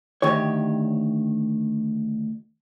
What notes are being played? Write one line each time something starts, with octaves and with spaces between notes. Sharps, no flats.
D2 D#3 G4 C#5